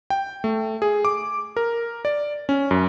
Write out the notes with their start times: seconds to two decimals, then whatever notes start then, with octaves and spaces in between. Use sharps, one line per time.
0.10 G5
0.44 A3
0.82 G#4
1.05 D6
1.56 A#4
2.05 D5
2.49 C#4
2.71 F#2